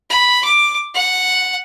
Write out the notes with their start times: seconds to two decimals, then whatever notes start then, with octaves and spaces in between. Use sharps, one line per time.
0.10 B5
0.44 D6
0.94 F#5